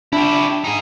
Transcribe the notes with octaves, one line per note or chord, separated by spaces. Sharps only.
D4 E4 G4
D#4 G#4